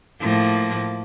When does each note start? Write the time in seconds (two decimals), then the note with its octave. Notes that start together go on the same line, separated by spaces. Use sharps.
0.19 A2 F3 A#3